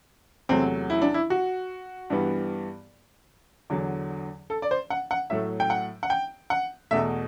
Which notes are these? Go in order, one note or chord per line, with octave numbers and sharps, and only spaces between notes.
E2 C3 F#3 A3 C4
E4
D4
E4
F#4
G2 E3 G3 B3
E2 D3 F#3
A4
D5
C5
F#5
F#5
A2 F#3 A3 E5
G5
F#5
F#5
G5
F#5
E2 B2 A3 E5